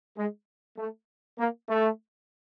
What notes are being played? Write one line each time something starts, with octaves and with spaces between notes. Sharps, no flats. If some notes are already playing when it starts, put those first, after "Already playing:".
G#3
A3
A#3
A3